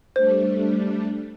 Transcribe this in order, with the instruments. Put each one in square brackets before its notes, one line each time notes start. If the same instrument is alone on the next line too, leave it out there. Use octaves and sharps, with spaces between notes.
[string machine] G3 A3 D4 [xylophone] C5